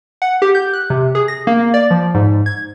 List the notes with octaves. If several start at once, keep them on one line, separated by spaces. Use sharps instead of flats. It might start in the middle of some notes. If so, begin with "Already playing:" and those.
F#5
G4
G6
F#6
C3
G#4
A#6
A#3
D5
F3
G#2
G#6